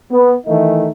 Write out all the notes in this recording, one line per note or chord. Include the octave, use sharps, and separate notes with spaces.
B3
D#3 E3 A3 D#4